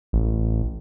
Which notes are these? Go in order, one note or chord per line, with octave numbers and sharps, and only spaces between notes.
A1